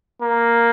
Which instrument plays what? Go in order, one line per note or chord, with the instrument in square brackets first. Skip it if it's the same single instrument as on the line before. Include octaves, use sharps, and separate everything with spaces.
[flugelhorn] A#3